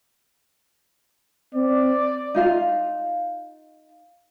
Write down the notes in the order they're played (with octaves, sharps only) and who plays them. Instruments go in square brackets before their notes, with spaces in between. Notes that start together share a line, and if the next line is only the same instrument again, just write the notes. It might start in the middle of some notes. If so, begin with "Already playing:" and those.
[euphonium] C4 [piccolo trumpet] D5
[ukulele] D#4 F4 F5